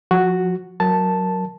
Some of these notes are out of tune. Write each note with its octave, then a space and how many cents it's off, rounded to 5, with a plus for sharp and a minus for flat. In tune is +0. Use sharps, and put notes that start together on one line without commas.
F3 +25 F#4 +0
F#3 -5 A#4 +0 A5 +0